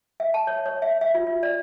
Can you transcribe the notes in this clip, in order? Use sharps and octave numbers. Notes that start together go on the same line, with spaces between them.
E5
A5
C#5
C#5
E5
E5
F4
F4
D5